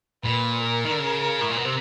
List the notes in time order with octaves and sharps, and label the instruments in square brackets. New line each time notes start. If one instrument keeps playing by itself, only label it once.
[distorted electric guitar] A#2 [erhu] B4
[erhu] A#4
[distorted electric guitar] D#3
D3
C#3
A2
A#2
B2
C3